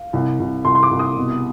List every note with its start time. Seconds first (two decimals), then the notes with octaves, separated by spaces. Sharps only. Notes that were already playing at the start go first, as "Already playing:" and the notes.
Already playing: F5
0.13 C2
0.40 C2
0.65 C2 C6
0.75 C6
0.83 D6
0.91 C2
0.99 D#6
1.17 B2